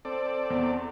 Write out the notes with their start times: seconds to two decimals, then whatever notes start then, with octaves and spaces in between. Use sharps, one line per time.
0.05 C4 A4 D5
0.50 E2